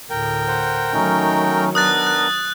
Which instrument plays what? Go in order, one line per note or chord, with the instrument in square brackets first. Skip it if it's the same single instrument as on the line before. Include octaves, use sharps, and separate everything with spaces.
[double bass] D2 A2 [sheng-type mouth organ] A#4 G5
[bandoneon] C5 F#5
[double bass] D#3 F#3 [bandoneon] A3 C#4 D#4
[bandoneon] B3 D4 [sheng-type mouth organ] A#4 [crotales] D#6 F#6 A6
[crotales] F#6